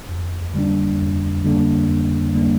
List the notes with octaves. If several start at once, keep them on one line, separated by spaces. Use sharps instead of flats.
F2
D3 G3 A#3 D4
F2
D3 G3 A#3 D4
F2
D3 G3 A#3 D4